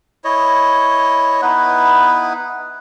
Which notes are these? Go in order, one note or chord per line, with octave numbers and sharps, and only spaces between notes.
E4 C#5 D#5
B3 D#4 E4 B4